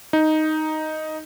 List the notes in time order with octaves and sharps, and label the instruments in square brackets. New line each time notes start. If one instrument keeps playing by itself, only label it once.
[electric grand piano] D#4